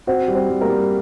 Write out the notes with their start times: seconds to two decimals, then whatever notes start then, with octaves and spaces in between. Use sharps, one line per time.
0.07 C4 F#4 C5
0.28 G3
0.35 C4 C5
0.49 G3
0.61 A#3 A#4
0.69 G3